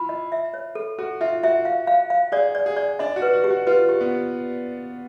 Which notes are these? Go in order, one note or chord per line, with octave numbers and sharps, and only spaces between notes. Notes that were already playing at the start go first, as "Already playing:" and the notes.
Already playing: E4 F4 B5
D#5
E5
C#5
A4
F#4 A4
F4 E5
F#4 E5
F5
F5
F5
G#4 D5
D5
G#4
D5
D4 D#5
F#4
B4
F#4
G4
F#4
F4 B4
G4
B3